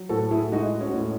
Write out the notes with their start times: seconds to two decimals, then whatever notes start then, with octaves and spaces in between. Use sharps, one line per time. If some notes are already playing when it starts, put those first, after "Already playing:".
Already playing: F#3
0.09 A2 F#4 A4
0.31 E4 G#4
0.52 G#3 D#4 F#4
0.81 C#4
0.94 A2